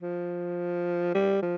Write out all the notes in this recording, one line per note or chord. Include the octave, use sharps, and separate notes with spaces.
F3
G3
F3